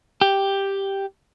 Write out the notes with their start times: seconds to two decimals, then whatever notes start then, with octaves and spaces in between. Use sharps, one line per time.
0.21 G4